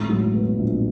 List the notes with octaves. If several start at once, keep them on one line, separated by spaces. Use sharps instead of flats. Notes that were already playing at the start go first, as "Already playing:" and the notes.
Already playing: G#1 A2
F#3
B3
A#1